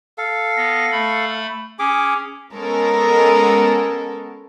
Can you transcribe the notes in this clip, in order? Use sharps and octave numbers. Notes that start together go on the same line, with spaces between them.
A4 F5
B3 A#6
A3 B5
C#4 G#4 D6
G#3 B3 C#4 A4 A#4